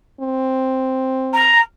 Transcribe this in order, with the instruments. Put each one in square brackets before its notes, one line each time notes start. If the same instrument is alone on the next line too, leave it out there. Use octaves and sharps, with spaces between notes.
[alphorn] C4
[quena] A#5